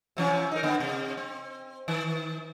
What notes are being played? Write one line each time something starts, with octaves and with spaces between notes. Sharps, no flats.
C3 E3 C#4
D#4 A#4
D3 B3
C3
C4
D#3